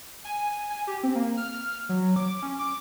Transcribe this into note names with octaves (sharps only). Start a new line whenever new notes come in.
G#5
G#5
G#5
G4
C4
A#3
F6
F#3
D6
C#4
D6